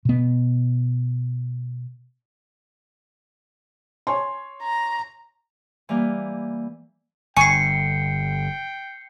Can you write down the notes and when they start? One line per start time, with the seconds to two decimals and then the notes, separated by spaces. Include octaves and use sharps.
0.05 B2 B3
4.07 C#5 G#5 C6
4.62 A#5
5.89 E3 G3 A#3
7.37 G1 G5 G#5 C#6 C7 C#7